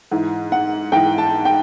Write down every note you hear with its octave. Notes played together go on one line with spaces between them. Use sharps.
G#2 E3
F#5
G#2 E3 G5
A5
G5